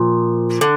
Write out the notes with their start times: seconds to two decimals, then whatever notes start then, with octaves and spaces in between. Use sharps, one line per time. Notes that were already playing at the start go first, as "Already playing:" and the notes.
Already playing: A#2 F3
0.61 D3